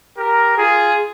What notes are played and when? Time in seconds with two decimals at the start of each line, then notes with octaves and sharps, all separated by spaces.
0.18 G4 A#4
0.58 F4 G#4